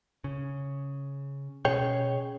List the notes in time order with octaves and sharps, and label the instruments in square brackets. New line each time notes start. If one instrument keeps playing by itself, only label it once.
[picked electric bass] C#3
[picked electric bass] B2 C#4 [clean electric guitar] G#4 C#5 G5